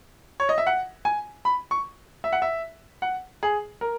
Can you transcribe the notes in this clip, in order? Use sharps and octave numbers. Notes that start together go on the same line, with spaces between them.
C#5
D#5
E5
F#5
G#5
B5
C#6
E5
F#5
E5
F#5
G#4
A#4